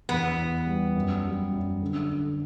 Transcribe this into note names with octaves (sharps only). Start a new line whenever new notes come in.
E2 B3
E2
G3
F#2
G3
F#2
D3
D3